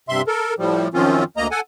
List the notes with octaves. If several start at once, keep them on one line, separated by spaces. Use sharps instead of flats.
G2 C3 E5 C6
A4 A#4
A2 F3 G3
F#2 D#3 F3 C4 C#4 F4
D2 A#3 D#5 A#5
A4 F#5 G#5